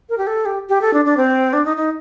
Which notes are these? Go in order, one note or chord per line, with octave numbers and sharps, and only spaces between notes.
A#4
G4
A4
G4
G4
A4
D4
D4
C4
D4
D#4
D#4